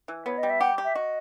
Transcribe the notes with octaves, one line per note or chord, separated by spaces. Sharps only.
E3
B3 C#5
D#5
G3
E5
G4 F#5
G4
E5
F#4 D#5